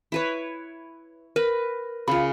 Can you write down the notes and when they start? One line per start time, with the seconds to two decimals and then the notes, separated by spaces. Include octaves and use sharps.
0.12 E4 B4 C#5
1.36 A#4 B4
2.08 C#3 F4 B5